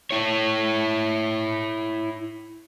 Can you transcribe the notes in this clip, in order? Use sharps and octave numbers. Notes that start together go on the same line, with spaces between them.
E4 C#5